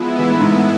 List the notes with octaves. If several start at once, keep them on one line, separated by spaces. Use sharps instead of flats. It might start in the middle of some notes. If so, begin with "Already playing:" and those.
Already playing: F3 G#3 B3 E4
E3
A2
G#2
A2